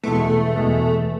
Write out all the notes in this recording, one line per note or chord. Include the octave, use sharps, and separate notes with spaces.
E2 B2 G#3 A3 B3 E4
E2 B2 G#3 B3 E4